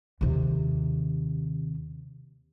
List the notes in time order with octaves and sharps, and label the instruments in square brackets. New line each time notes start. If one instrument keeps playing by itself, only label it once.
[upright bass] D#2 C3